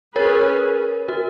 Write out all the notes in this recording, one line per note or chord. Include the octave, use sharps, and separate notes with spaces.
C#4 G#4 A#4 B4 C#5
F#4 A#4